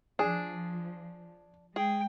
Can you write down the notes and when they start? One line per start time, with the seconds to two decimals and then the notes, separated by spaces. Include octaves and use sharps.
0.19 F3 D4 G#4
1.76 G#3 G#4 G5